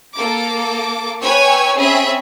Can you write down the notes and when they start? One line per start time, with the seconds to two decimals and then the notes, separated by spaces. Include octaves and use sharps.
0.15 A#3 A4 D6
1.21 B4 C#5 G5 G#5 C#6 E6
1.77 C4 C#4 G#4 E5 B5